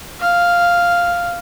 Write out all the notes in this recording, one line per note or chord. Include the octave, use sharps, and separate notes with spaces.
F5